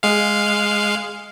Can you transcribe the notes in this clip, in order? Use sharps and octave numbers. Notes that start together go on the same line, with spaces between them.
G#3 F5